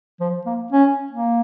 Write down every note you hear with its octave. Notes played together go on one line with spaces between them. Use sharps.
F3
A#3
C#4
A#3